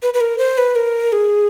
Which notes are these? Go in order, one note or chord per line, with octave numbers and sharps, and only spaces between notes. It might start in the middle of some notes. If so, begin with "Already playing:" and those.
B4
B4
A#4
C5
B4
A#4
G#4